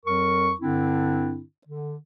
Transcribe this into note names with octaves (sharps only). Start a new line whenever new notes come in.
F2 F#3 A#4 C#6
G2 D3 C4 D4 E4
D3